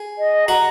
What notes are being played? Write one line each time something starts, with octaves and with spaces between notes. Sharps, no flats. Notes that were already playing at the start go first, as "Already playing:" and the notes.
Already playing: G#4
D#5
F#4 A#5